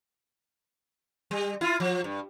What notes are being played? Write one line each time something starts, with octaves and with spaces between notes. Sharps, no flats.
G3
E4 F4
F3
G2